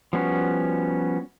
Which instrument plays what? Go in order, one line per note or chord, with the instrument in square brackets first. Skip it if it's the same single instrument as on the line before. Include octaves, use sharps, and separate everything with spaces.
[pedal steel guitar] F3 G3 B3 C#4 F#4